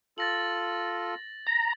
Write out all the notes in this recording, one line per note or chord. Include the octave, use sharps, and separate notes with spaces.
F4 A4 A6 A#6 F#7
A#5